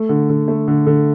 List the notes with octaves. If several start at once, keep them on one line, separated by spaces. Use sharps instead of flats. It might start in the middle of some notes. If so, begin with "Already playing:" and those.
Already playing: A3
D3
D3
A3
D3
D3